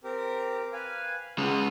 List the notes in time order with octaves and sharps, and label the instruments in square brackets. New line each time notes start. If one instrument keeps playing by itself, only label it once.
[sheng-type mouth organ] C4 G4 A#4
B4 F5 G#5
[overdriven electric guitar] C#3 G#3 [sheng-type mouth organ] B3 C6 D#6